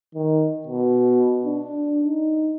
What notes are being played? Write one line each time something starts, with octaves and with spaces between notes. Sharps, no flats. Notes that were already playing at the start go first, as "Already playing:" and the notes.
D#3
B2
D4
D#4